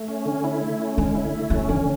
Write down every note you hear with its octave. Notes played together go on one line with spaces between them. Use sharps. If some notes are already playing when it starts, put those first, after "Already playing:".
Already playing: A3
C#4
D3
E4
A3
C#4
D3 G#3
E4
A3
F#3 C#4
D3 E3